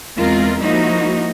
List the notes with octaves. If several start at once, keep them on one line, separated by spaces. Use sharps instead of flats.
E2 G#3 C4 F4 A#4
F3 G#3 A#3 D#4 E4 F#4